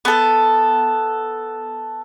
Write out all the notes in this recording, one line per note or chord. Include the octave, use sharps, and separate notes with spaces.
B3 A4